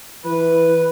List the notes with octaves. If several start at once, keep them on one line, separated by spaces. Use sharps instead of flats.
E3 B4